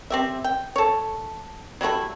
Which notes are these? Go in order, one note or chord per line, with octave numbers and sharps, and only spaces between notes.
C4 G4 E5
G5
A4 C#5
F#3 G3 A3 E4